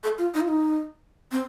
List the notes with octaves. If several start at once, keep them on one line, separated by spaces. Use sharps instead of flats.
A4
F4
D#4
F4
D#4
C4